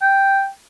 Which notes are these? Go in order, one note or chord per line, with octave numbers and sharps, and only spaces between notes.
G5